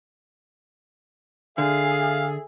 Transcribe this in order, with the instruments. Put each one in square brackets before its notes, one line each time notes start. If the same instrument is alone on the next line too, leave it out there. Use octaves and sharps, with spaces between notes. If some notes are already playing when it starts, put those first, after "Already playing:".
[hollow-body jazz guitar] D3 [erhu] G#4 [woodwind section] A4 E5 [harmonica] F5